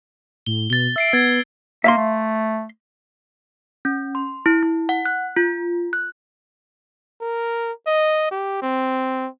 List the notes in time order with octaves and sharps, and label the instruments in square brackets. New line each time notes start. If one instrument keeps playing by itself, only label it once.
[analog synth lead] A2 [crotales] G7
[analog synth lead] B2 [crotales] A6 G7
[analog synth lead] E5 [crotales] E6 C7 D7
[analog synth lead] B3 [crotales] G#6 A6
[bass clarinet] A#3 [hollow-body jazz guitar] E5 F5 C6
[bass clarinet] A3
[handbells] C#4
C6
E4
E4
F#5
F#6
F4
F#6
[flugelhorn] A#4
D#5
G4
C4